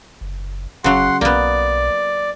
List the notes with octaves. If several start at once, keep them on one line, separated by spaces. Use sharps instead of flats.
F#1
F1 C#3 F#3 F#5 C6
B1 A#3 B3 D5